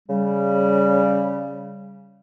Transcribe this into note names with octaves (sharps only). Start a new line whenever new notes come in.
C#3 G3